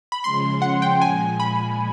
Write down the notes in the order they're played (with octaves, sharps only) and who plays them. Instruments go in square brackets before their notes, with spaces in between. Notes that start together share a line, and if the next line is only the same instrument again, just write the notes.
[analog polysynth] B5
[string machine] C#3 F3 G#3 C#4 [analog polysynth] C6
[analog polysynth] F#5
G5
[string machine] A#2 F3 G#3 [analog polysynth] G#5
[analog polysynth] B5